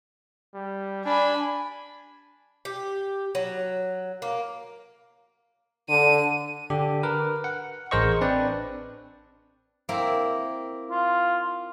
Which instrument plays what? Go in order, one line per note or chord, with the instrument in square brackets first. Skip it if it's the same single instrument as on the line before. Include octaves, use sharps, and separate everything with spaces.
[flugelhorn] G3
[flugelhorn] D4 [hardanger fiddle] G#5 B5
[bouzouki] G4
F#3
A#3
[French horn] D3 [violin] D#7
[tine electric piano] D3 D4 G4
A#4 B4
F#5
A1 G#4 A#4 C5 D#5 C#6
C4 D4 B4 D5
[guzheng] A#3 C4 E4
[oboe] F4